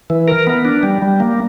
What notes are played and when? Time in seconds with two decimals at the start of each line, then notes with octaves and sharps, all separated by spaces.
0.10 E3
0.28 A#4
0.47 B3
0.65 D4
0.83 G3
1.02 G3
1.20 A#3